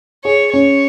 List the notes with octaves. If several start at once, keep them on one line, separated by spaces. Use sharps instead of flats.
G#4 C#5
C#4 C#5